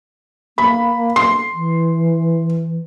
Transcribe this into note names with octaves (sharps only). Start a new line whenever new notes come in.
A#3 B5
C6
E3